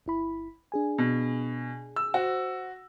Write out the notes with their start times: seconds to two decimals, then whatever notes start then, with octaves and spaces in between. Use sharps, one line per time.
0.06 G1 E4 B5
0.72 D4 G#4 G#5
0.98 B2
1.96 E6
2.14 F#4 C5 F#5